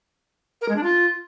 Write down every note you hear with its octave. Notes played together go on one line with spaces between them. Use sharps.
A#4
G#3
D4
F4